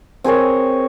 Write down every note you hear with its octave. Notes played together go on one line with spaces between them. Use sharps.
C4 G#4 A#4 C#5